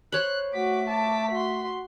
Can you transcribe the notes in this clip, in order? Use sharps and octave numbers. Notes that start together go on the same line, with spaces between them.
C5 C#5 B5 F#6
A3 F#4 D6 B6
A5 D6
F#4 C6